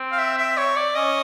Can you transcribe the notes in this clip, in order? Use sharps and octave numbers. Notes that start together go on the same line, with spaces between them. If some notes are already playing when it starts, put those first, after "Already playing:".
Already playing: C4
F5
E5
E5
C#5
D5
C#4 D#5